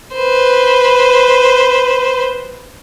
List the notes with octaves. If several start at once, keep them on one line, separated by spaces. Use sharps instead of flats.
B4 C5